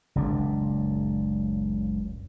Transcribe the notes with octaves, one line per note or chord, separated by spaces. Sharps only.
F#1 C#2 A#2 D4